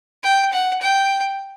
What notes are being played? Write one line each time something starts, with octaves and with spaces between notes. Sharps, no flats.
G5
F#5
G5